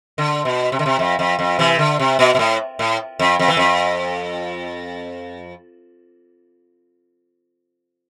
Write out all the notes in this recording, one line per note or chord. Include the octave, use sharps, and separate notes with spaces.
D3
B2
C3
D3
C3
F2
F2
F2
C3 E3
D3
C3
B2
B2
A2
A2
F2
F2
E3
F2